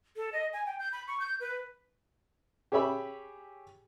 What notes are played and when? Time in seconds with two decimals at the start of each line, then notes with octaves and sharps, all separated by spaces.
0.16 A4
0.33 D#5
0.53 G#5
0.66 G5
0.79 G6
0.92 B5
1.08 C#6
1.20 G6
1.40 B4
2.72 G4 G#4 C#5 E5 B5